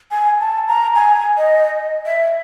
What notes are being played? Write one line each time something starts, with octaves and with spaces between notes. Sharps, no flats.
G#5
A5
A#5
G#5
D#5
E5